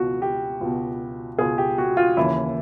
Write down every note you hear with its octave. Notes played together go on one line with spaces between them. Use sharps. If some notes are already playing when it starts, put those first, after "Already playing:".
Already playing: C#2 B2 F#4
G4
C#2 B2
C#2 B2 G#4
G4
F#4
F4
D#2 C#3 E3 E4